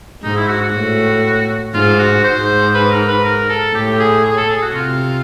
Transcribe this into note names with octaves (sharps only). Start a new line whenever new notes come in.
G#2 D#4
E4
F#4
F#4
A2
G#2 F4
F#4
G#2 C5
B4
A#4
B4
A#4
A4
A2 G4
G#4
G#4
A4
G#4
F#4
C3 F4